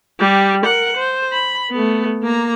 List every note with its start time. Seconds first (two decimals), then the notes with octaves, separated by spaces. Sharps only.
0.19 G3 G4
0.64 A#4 F#5
0.96 C5
1.32 B5
1.71 A3 B3
2.23 A#3 A#5